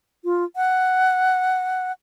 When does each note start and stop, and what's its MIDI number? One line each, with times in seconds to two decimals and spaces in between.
0.24 0.44 65
0.56 1.92 78